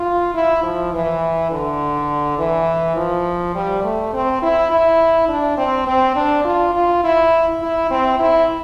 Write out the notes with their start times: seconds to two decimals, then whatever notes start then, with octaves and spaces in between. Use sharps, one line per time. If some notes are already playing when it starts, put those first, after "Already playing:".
Already playing: F4
0.34 E4
0.63 F3
0.93 E3
1.52 D3
2.39 E3
2.97 F3
3.55 G3
3.84 A3
4.13 C4
4.42 E4
4.71 E4
5.29 D4
5.58 C4
5.87 C4
6.16 D4
6.45 F4
6.74 F4
7.04 E4
7.62 E4
7.91 C4
8.19 E4